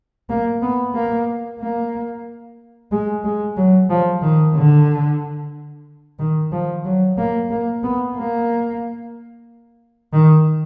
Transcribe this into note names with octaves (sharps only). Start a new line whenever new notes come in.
A#3
B3
A#3
A#3
G#3
G#3
F#3
F3
D#3
D3
D#3
F3
F#3
A#3
A#3
B3
A#3
D#3